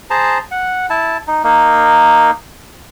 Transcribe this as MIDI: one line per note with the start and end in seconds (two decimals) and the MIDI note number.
0.10 0.38 68
0.10 0.38 72
0.10 0.38 81
0.10 0.38 82
0.51 0.86 78
0.90 1.17 64
0.90 1.17 81
1.27 1.43 63
1.44 2.31 58
1.44 2.31 63